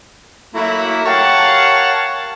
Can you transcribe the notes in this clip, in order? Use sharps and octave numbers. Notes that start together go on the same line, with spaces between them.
F#3 A3 A#3 E4
G4 A#4 C#5 F5 F#5 A5